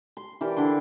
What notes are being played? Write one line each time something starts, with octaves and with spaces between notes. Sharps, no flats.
C6
E3 G4 A#4 D5
D3 D4 E4 C6